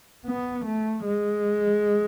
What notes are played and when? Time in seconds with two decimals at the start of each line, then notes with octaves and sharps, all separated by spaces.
0.26 B3
0.66 A3
1.05 G#3